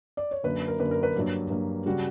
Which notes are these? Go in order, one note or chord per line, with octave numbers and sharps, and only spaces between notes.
D5
C#5
F#2 D3 A#3 B4
A#4
F#2 D3 A#3 B4
A#4
B4
G2 F#3 A#3
G2 F#3 A#3
C#3 G3 F#4